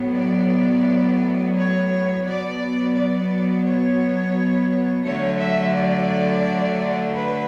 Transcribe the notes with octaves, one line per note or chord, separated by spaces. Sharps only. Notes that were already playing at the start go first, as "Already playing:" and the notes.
Already playing: A2 F#3 B3
D5
C#5
B2 F#3 B3 D5
D5
C#5
D3 F#3 A3 C#5
E5
D5
B4